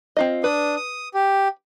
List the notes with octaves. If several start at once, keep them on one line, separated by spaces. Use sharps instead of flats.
C4 F4 D#5
D4 B4 D#6
D#6
G4